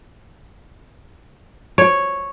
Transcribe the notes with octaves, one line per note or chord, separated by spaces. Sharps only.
C#5